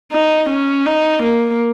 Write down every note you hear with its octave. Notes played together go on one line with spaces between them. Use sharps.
D#4
C#4
D#4
A#3